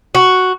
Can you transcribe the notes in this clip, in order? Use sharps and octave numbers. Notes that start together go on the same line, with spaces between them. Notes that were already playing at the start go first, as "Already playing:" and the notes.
F#4